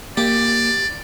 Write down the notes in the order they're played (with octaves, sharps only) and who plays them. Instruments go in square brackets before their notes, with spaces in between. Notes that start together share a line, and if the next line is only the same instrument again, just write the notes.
[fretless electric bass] A#3 [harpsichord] G4 [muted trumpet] D5